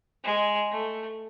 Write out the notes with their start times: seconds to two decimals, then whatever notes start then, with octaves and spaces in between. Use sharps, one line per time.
0.24 G#3
0.71 A3